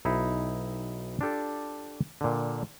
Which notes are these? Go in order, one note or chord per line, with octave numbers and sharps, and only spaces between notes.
B1 D#4 E4
D4 F4 G4 A4
A#2 D3